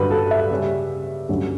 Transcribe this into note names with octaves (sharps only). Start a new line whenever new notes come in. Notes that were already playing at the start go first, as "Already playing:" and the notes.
Already playing: G2 D3 F#3 B4
A4
E5
C#3 G3 C#4
G2 D3 F#3 C#4